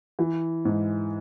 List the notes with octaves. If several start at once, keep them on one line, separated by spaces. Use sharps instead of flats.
E3
G#2